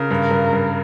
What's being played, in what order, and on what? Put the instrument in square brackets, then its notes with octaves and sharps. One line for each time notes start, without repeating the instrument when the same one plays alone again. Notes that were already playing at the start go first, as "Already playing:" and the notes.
Already playing: [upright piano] C#3 [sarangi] A#4
[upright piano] G2
G2
G2